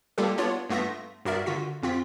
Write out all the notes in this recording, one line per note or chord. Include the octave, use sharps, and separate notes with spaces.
G3 A#3 F4 G4 A4
B3 D4 F4 C#5 D5
G2 A3 B3 F4 E5 A#6
G2 F#4 A#4 D5 E5
D3 F4 F#4 B6
F2 C4 F4 B6